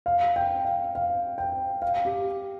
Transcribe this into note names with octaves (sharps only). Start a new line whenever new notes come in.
F5
G5
F5
F5
G5
F5
G4